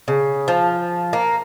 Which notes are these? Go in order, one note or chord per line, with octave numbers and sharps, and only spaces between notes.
C#3
F3
A#3